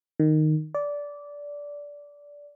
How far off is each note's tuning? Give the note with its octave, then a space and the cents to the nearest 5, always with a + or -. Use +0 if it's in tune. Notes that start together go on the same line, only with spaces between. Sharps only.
D#3 -10
D5 -15